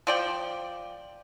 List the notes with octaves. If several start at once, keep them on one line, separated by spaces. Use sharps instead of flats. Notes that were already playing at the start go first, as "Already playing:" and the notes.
F3 D5 G5